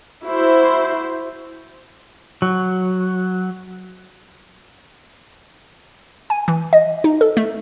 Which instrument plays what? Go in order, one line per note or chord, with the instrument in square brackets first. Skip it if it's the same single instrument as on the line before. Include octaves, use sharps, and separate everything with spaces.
[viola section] E4 F#4 C5
[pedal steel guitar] F#3
[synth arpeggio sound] G#5
E3
D#5
D#4
A4
A3